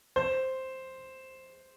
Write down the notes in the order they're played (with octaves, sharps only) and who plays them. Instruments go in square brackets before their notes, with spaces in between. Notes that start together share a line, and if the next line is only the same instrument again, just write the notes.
[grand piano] C5